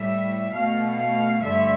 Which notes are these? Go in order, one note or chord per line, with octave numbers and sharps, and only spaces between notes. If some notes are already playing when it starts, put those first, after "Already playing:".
Already playing: A2 G3 E5
B2 A3 F5
F5
G2 D3 A3 E5